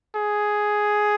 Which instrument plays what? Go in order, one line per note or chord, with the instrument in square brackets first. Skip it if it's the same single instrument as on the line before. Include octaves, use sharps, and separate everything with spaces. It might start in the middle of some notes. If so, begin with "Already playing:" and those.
[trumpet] G#4